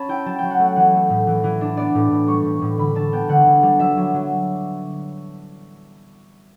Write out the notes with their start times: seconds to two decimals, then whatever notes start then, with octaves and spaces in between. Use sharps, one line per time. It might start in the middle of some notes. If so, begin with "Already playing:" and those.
Already playing: C#4 A5 B5
0.09 E4 G5
0.25 F#3 A5
0.39 F#3 G5
0.50 F#5
0.59 A3
0.64 F#5
0.76 E3 F#5
0.93 A3
1.10 A2
1.27 E3
1.44 E3
1.61 D4
1.77 B3 D5
1.95 A2
2.11 A2
2.27 G3 C#6
2.45 A2
2.62 A2
2.78 D3 B5
2.95 D3 A5
3.12 B3 G5
3.29 D3 F#5
3.46 D3
3.63 G3
3.79 F#3 E5
3.97 F#3
4.14 F#3